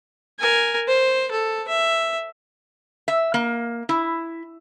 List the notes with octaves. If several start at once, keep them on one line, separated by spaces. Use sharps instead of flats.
A#4 G#5
C5
A4
E5
E5
A#3
E4